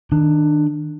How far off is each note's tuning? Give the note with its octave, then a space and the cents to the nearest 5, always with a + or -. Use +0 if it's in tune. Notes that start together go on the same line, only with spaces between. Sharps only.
D#3 +0 D4 +20